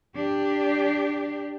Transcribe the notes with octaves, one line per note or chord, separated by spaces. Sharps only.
D4 G4